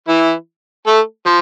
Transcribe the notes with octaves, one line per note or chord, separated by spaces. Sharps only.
E3 E4
A3 A4
F3